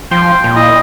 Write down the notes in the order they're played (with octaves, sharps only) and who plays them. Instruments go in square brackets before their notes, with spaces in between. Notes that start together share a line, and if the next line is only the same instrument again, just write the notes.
[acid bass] F3 [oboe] G5 [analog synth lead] C6
[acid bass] A#2
[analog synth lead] E4 [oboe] D#5